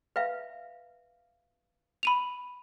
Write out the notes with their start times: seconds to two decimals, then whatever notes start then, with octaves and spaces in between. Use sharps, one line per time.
0.16 B4 E5 F5
2.03 B5 D#7 F7